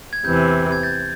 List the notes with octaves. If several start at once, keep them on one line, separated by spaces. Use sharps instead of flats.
G#6
E2 C3 E3 G6
G#6
G6 A6